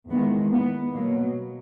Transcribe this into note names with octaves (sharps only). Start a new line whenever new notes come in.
E2 D#3 G#3 B3
B3
B2 F#3 A#3